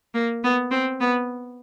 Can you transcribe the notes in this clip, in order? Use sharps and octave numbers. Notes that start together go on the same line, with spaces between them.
A#3
B3
C4
B3